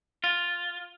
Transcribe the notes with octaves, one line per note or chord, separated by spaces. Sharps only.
F4